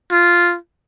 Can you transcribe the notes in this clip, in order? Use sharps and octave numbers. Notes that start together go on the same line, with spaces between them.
F4